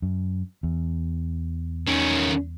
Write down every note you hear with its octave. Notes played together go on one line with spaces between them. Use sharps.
F#2
E2
D#3 C#4